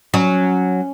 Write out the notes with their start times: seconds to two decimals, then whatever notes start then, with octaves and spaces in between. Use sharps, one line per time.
0.14 F#3 C#4